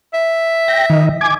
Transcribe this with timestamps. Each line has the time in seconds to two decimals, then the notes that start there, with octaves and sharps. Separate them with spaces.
0.13 E5
0.68 G5 A#6
0.90 D#3 D#5
1.21 G#5 D6 G#6